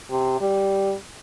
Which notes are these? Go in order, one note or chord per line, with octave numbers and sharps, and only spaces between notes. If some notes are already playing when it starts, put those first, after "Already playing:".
C3
G3